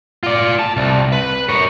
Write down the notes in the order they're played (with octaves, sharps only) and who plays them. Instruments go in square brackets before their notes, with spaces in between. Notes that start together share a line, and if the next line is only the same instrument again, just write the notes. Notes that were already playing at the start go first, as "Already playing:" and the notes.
[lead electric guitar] F4 D5
A5
C2
B4
A#4 C#5